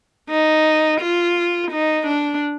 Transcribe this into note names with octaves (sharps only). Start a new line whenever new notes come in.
D#4
F4
D#4
D4